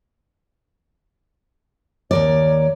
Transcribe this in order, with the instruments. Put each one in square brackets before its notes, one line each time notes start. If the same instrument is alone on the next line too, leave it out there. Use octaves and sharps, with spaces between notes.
[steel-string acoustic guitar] D#2 A#4 D5 [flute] C#5